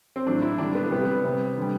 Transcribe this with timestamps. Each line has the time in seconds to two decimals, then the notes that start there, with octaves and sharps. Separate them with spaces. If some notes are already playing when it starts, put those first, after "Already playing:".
0.16 C4
0.27 A2 F#3 A3 D4
0.42 E4
0.58 D3 G3 D4
0.75 B3
0.91 C3 G3 B3
1.24 C3 G3
1.57 D3 G3